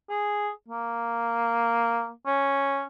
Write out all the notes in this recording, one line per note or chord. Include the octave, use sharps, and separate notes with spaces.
G#4
A#3
C#4